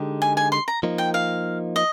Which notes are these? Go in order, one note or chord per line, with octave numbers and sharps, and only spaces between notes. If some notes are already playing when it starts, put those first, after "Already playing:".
Already playing: D3 G#3 D#4 G4
G#5
G#5
C6
A#5
F3 A#3 D#4
G5
F5
D#5